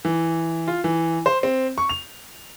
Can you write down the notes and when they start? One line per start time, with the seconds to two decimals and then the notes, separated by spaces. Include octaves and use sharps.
0.05 E3
0.68 F4
0.84 E3
1.26 C5
1.43 C4
1.78 C#6
1.89 F7